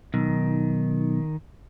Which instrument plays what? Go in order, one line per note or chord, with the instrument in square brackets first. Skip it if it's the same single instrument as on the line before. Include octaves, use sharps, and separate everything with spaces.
[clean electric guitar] B1 [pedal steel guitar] D#3